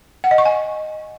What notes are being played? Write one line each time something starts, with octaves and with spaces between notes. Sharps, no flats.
F#5
D#5
C#6
G#5